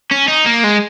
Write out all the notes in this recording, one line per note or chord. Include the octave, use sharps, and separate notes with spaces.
C#4
D#4
A#3
G#3